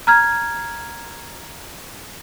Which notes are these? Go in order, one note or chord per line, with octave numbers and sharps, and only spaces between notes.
A#5 F6 G#6